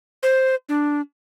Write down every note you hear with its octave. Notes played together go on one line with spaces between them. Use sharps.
C5
D4